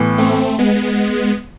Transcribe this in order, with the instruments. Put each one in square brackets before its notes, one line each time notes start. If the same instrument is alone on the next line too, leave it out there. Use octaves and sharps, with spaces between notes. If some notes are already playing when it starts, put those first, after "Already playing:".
Already playing: [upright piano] A2 E3 B3
[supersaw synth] A3 C4
G#3 B3